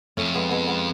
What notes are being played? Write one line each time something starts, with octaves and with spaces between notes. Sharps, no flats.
F2 A3 C#4
G#3 B3
G#3 B3
G#3 B3